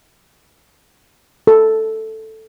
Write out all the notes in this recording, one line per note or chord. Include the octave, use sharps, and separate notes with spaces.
A4